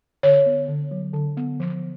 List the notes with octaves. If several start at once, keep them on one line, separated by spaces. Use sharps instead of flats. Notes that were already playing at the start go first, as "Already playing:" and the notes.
D3 C#5
B3
D3
F#3
D3
B3
F3